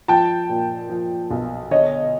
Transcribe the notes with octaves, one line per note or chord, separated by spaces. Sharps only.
F3 G5 A5
A#2
F3
B1
D3 C#5 D#5